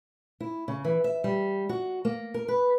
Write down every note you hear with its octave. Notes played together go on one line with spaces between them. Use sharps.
E4
C#3
E3
E5
G3
F#4
A#3
A#4
B4